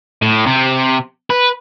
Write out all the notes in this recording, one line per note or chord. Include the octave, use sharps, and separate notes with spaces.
A2
C3
B4